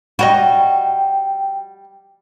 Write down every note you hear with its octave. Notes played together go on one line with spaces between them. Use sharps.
G3 F#4 C#5 D#5 G5